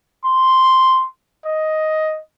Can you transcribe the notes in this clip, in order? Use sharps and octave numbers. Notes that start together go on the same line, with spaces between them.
C6
D#5